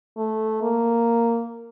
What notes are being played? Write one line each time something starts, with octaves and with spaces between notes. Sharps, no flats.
A3
A#3